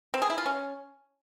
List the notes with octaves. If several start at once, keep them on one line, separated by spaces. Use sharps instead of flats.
C4
G#4
E4
F4
C#4